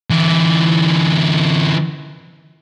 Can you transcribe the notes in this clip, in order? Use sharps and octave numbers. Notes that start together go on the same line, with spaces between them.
D3 E3